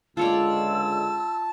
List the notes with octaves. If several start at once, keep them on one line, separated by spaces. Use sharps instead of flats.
C#2 D3 G#3 F4 C#5 D5 A5 E6